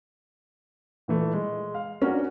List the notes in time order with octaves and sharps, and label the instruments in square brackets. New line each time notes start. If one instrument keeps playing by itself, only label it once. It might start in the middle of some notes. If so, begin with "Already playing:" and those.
[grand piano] A#2 E3 A3
G#3
F5
[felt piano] C#4 [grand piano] D4 F#4 A#4